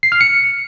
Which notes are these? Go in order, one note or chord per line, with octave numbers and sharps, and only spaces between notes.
C7
F6
C#7